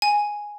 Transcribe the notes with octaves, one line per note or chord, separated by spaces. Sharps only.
G#5